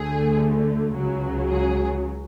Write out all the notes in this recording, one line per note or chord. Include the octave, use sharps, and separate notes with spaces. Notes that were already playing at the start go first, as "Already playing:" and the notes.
Already playing: D2 D3 A3 G#4
C#2 C#3 F#3
G#4